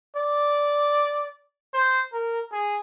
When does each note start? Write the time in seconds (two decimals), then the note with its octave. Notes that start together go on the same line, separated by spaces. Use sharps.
0.16 D5
1.74 C5
2.13 A#4
2.52 G#4